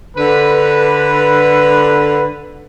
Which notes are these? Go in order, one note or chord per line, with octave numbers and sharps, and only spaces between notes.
D3 B4